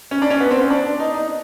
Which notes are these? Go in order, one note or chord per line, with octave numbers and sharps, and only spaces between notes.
C#4
D4
C#4
B3
C4
C#4
D4
D#4
D#4